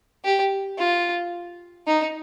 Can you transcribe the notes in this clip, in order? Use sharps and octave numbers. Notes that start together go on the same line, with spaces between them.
G4
F4
D#4